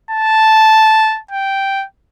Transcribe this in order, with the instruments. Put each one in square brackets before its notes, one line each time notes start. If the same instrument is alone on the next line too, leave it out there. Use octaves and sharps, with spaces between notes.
[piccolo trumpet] A5
G5